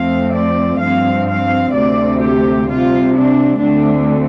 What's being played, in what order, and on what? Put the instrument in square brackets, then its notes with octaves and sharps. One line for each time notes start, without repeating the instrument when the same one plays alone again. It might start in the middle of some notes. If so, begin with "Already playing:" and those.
Already playing: [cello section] F2 F3 A3 C4 F5
D5
G2 F3 C4 F5
F5
D2 C3 A3 C4 D5
G4
C3 G3 C4 F4
D4
D2 D3 A3 C4 D4